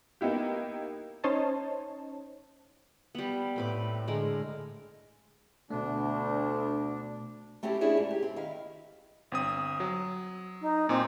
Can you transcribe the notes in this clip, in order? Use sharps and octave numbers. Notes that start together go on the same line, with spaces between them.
A#3 B3 D#4 E4 G4
C#4 D#4 C5 C#5 D#5 A5
G3 B3
A2 C4 B4 D6
D3 G#3 A#4
D2 B2 A3 D4
A3 C4 C#4 E4 G4
C#4 D4 E4 G4 G#4 C#5
G#2
G4
C4
D#3 E4 F5
G1 C4 D#6
F#3
D#4
A#2 C4 G#5 D6